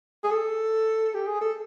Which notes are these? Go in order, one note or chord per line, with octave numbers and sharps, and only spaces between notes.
G#4
A4
G4
G#4
A4